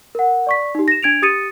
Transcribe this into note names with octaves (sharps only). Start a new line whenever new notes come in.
A#4 F#5
D5 C#6 B6
D#4 G4
A#6 E7
D4 G#6 D7 F7
G4 D#6 A6 C#7 D#7